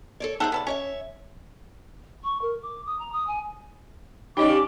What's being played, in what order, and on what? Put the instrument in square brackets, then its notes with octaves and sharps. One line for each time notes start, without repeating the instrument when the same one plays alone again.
[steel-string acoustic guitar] A4 C#5 D5
[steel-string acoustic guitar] D#4 G#4 C5 [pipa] A4 E5 F#5
[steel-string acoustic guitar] C#3 [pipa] B3 A4 D5
[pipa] C#4 [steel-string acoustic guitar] C#5 D5 E5
[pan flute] C#6
A#4
D6
D#6
A#5
D#6
G#5
[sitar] C#3 G3 G4 [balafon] D#4 C#5 D#5 [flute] D6